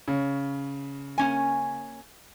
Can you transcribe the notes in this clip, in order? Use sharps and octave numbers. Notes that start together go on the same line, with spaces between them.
C#3
A#3 C#4 G#5